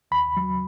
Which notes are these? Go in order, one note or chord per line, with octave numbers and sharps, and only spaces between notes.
D#2 B5
F#3